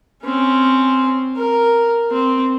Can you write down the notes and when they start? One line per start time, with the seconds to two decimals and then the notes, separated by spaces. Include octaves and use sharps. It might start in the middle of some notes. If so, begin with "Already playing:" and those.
0.23 C4 C#4
1.36 A#4
2.11 C4